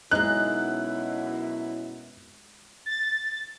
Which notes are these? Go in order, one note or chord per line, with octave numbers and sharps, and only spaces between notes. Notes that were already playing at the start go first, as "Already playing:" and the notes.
F#2 B2 G#3 D#4 E4 F#6
A6